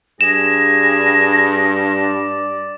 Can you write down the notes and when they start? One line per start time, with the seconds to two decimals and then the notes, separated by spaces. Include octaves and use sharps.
0.21 G2 G#4 A#6 E7
2.00 D5